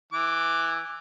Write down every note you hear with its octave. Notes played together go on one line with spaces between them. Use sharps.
E3 D6